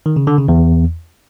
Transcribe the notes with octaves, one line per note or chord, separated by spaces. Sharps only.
D#3
C#3
D3
C#3
E2